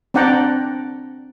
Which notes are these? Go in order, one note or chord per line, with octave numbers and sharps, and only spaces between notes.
C4 D4 D5 F#5 G5 A#5